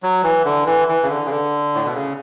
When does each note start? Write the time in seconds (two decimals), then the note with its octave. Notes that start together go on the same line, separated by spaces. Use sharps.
0.03 F#3
0.23 E3
0.45 D3
0.66 E3
0.88 E3
1.03 C#3
1.09 D3
1.26 C#3
1.31 D3
1.75 A2
1.84 B2
1.94 C#3